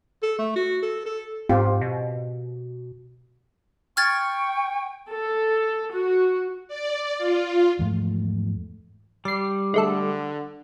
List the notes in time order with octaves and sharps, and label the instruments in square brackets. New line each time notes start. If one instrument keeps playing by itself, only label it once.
[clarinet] A4
A3
F#4
A4
A4
[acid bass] G#2 [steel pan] C4 F4 G4
[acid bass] B2
[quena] G5 [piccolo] C#6 [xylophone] F6 G#6 A6
[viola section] A4
F#4
[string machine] D5
F4
[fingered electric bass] E2 G#2 F3 A3
[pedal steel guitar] G3 [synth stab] D5 C7
[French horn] D3 [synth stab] G#3 A3 A4